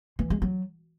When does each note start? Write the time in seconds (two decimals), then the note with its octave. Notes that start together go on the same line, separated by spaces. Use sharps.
0.19 E3
0.30 G#3
0.42 F#3